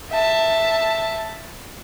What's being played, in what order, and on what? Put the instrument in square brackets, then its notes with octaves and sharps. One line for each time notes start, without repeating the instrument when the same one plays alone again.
[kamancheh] E5 A5